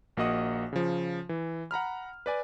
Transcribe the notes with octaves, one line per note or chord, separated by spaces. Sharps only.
A#1 A#3 F#4 D#5 F#5 D#6
C#3 F3
E3
F#5 A#5 B5 F6
B4 D5 G#5